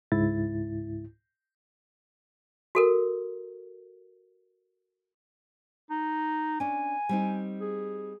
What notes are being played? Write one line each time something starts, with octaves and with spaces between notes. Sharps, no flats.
C#2 G#2 E4 A6
F#4 A4 A#4
D#4
C#4 D4 G#5
G3 C4 D#4
G#4